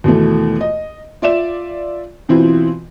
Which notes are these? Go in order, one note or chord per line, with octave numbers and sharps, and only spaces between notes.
D#2 B2 E3 A3
D#5
F4 D5 E5 E7
B2 E3 C4 E4 F4